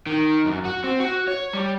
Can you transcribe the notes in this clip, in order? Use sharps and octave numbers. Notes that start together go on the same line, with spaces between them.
D#3
F#2
F#4
C4
F#4
C#5
G3